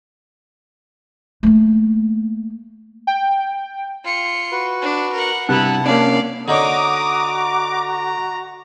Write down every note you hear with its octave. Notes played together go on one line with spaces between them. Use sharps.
A3 A#3
G5
F4 C#7
F#4 B4
D4
A#4 F#5
G2 C3 B3 E4 F#5 A5 F#6
A#3 C#4 D4 D5 F5
D3 D#4 F#4 C#5 A#5 D6 D#6
A#5